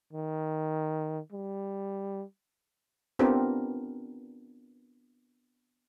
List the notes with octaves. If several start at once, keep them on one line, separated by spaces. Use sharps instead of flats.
D#3
G3
B3 C4 D4 F4 G4 A#4